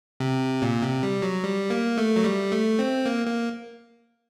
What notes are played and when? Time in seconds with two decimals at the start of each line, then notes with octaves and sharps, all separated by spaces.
0.20 C3
0.62 A#2
0.82 C3
1.03 G3
1.22 F#3
1.44 G3
1.70 A#3
1.98 A3
2.16 F#3
2.24 G3
2.52 A3
2.79 C4
3.06 A#3
3.27 A#3